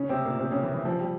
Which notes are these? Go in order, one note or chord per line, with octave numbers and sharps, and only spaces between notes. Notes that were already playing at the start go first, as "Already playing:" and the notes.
Already playing: C#3 C#4
C3 C4
A#2 A#3
C3 C4
C#3 C#4
E3
E3
F3
G3